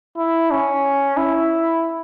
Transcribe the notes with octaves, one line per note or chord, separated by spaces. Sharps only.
E4
C#4
E4